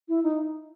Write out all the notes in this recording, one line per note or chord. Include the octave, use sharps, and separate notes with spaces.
E4
D#4